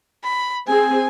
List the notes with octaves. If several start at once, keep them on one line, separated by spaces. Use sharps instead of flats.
B5
C4 G#4 G#5